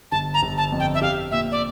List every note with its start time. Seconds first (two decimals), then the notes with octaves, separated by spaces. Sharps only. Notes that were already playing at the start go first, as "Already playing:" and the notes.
0.12 G1 A5
0.34 A#5
0.43 G1
0.58 A5
0.72 F2
0.80 G5
0.94 E5
1.01 G4 F5
1.31 A#2 E5
1.52 D5